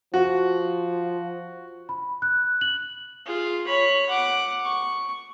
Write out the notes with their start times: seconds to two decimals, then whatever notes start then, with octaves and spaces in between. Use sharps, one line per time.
0.14 F3 F#4
1.89 B5
2.22 F#6
2.61 F#7
3.26 F4 G#4
3.67 C#5 B5
4.10 F#5 D6
4.64 C#6